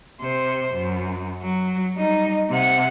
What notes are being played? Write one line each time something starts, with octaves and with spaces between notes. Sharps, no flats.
C3 C5
F#2
F#3
G3 D#4
C3 F#5